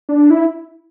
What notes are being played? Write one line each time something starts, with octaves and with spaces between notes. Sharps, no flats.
D4
E4